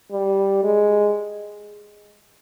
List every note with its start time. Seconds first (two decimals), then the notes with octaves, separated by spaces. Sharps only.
0.12 G3
0.64 G#3